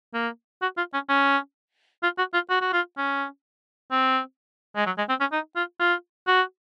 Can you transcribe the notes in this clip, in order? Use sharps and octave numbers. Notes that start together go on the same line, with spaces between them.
A#3
F#4
F4
C#4
C#4
F4
F#4
F4
F#4
F#4
F4
C#4
C4
G#3
F#3
G#3
C4
C#4
D#4
F4
F4
F#4